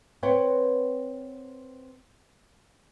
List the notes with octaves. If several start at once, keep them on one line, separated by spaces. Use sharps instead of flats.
C4 B4 C#5 F#5 G5